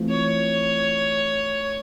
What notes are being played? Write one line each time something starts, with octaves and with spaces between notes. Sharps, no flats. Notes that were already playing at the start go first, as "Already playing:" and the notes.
Already playing: E3 A3 C4 F4
C#5